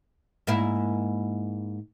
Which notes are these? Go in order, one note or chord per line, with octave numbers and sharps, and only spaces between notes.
G#2 A#3 E4